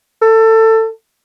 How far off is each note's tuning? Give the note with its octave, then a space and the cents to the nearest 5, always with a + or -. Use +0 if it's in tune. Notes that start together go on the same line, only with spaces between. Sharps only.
A4 +20